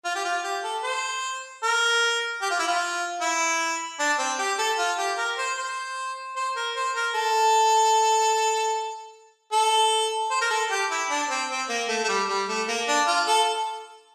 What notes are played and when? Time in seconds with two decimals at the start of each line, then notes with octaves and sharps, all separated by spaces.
0.05 F4
0.15 G4
0.25 F4
0.44 G4
0.64 A4
0.83 C5
1.63 A#4
2.42 G4
2.50 F4
2.59 E4
2.68 F4
3.21 E4
3.99 D4
4.19 C4
4.39 G4
4.59 A4
4.78 F4
4.98 G4
5.18 A#4
5.38 C5
5.58 C5
6.36 C5
6.56 A#4
6.76 C5
6.95 A#4
7.15 A4
9.52 A4
10.31 C5
10.41 A#4
10.50 A4
10.70 G4
10.91 E4
11.10 D4
11.29 C4
11.49 C4
11.69 A#3
11.88 A3
12.04 A3
12.09 G3
12.29 G3
12.49 A3
12.68 A#3
12.88 D4
13.07 F4
13.27 A4